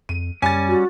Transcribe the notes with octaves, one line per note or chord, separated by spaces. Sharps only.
F2 D#7
F#2 G3 C#4 G#5 A6
F#4